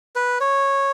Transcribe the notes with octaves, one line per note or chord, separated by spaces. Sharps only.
B4
C#5